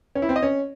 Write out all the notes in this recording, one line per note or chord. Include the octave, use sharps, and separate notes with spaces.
C#4
E4
C4
D#5
C#4